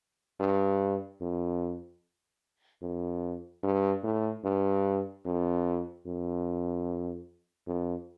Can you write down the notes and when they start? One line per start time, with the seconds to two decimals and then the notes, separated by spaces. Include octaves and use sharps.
0.40 G2
1.21 F2
2.82 F2
3.63 G2
4.04 A2
4.44 G2
5.25 F2
6.06 F2
7.67 F2